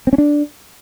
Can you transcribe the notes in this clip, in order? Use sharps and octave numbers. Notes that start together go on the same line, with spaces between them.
C4
C#4
D4